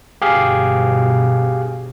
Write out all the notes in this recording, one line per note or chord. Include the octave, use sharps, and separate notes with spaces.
G1 B2 G4 G#4 F5